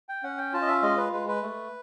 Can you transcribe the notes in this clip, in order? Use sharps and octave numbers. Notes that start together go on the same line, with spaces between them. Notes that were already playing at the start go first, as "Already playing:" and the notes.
G5
C#4 F#5
G5
F4 A5
D#5
E5
G#3 D#5
B4
G#3 B4
B4
A3